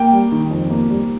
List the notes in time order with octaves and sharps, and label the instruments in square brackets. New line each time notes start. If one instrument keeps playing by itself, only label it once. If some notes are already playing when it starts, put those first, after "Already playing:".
Already playing: [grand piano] A#3 G5
G3
D#3
F2
A#3
G3